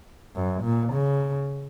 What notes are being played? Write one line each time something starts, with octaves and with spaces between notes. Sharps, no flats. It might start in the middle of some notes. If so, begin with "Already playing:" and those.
F#2
A#2
C#3